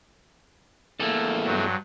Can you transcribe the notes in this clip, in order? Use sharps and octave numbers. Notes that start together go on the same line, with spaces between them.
E2 A3 A#3 A4
G2 F#3